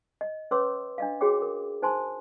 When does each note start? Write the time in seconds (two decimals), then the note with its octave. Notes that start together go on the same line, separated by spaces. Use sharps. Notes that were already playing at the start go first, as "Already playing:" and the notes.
0.21 D#5
0.51 C#4 B4 C#5 C6 D6 E6
0.98 D4 D#5 F5
1.21 F#4 G#4 C#5 G5 D6
1.42 A#4
1.82 D#4 C5 G#5 A5 C6